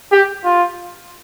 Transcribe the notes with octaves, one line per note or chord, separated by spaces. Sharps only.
G4
F4